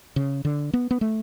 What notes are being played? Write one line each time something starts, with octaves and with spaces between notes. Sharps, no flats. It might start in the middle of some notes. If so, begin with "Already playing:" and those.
C#3
D3
B3
B3
A3